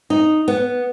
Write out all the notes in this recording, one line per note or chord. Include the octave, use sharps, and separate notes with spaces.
D#4
B3